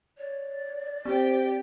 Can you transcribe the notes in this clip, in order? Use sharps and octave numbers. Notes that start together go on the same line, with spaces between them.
C#5 D5
C4 G4 C5 G5